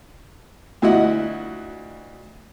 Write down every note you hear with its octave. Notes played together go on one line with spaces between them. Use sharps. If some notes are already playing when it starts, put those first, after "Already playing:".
D2 F3 E4 F#4 D#5 F#5